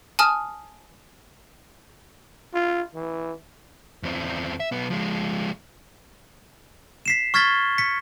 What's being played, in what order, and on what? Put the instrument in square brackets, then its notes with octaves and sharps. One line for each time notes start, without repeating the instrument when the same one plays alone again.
[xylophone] G#5 A5 D#6 F6
[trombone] F4
E3
[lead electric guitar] E2 C4
E5
B1 B3
F3 G#3
[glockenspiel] B6 C7 E7
C#6 F6 G#6 A6 B6 G7
B6 C#7